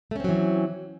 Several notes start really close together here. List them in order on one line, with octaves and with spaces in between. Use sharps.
A3 C#4 C4 F#3 E3